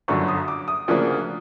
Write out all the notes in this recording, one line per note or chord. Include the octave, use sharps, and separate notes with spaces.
G1 F#2 D3 F#3 C#6
D#6
D6
D#6
D2 C#3 F3 A#3 D4